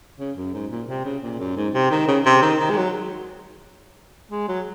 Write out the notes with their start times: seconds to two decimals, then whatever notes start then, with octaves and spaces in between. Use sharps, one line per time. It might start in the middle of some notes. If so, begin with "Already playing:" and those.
0.20 C#3
0.37 F#2
0.54 G#2
0.71 A#2
0.89 C3
1.05 C#3
1.23 A#2
1.40 F#2
1.56 G#2
1.74 C3
1.91 D#3
2.08 C#3
2.26 C3
2.42 D#3
2.60 D#3
2.70 G#3
2.77 F#3
4.31 G#3
4.48 F#3